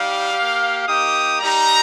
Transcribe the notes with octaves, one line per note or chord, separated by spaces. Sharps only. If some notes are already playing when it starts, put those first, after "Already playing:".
Already playing: G3 D#4 G4 F5
G4
A#3
A#3 D#4 G4 D#6
G3 D#4 G4 A#5